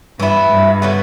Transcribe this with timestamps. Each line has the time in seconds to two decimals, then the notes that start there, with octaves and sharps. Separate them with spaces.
0.19 G2 E3 B3 E4
0.51 G2
0.82 D3 F#3 B3